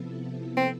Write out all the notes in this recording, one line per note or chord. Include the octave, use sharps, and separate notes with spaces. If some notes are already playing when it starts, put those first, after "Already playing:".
Already playing: C3 F3 B3 E4 A4
C4